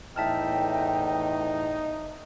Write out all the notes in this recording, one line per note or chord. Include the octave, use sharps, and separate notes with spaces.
E2 A2 D#4 E5 G5 A5 F6